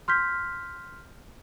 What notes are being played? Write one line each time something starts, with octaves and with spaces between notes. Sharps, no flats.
C6 F6 G6 B6